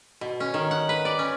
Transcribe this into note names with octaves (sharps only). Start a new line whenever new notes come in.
B2
C#4
D#3
F#5
B4
D5
C#4